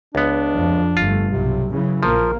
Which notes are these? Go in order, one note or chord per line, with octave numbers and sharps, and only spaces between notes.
C#2 B3 D4
F2 F3
G1 G2 A3 F4
B1 C3 F#3
C#3 E3 F#3
A#1 F3 A#3 A#4